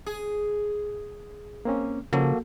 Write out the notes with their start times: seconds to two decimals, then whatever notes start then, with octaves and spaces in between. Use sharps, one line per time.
0.06 G#4
1.65 A#3 C4 C#4
2.13 C#3 F3 A#3 F#4 A4